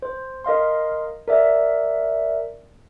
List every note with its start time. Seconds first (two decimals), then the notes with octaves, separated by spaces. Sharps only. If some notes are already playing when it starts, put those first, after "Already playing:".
0.02 C5
0.44 A#4 D#5 F5 C6
1.28 A#4 D5 E5